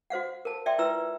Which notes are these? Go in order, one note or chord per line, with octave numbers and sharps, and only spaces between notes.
F#4 C5 F5 F#5
A#4 A5
D5 E5 G5 C6
E4 F4 B4 G5 A#5 E6